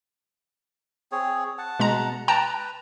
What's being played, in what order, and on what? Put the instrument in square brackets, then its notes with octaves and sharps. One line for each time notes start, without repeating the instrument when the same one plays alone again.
[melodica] C4 G#4 C#5
F#5 A5
[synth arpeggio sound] B2 G#3 A#5
[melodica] B4 [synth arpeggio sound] G5 A5 A#5